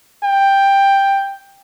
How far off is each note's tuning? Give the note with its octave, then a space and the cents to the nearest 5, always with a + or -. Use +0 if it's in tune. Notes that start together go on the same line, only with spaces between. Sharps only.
G5 +10